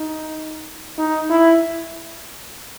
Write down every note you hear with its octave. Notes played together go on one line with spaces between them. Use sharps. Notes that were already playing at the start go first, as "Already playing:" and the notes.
Already playing: D#4
D#4
E4